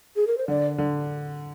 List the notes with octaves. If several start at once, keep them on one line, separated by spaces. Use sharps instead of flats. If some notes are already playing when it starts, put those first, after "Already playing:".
G#4
A#4
C5
D3 D5
D3